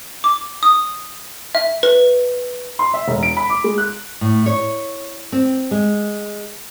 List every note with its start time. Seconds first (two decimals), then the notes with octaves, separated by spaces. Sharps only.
0.24 D6
0.63 D#6
1.55 E5
1.83 B4
2.79 C6
2.94 E5
3.08 E1
3.23 D7
3.37 B5
3.50 D6
3.64 G#3
3.78 F#6
4.21 A2
4.46 C#5
5.32 C4
5.71 G#3